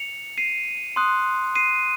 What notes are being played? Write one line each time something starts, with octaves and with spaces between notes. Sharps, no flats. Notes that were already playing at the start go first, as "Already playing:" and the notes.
Already playing: C#7 F7
C7 D#7
C6 D#6 F#6
C7 D#7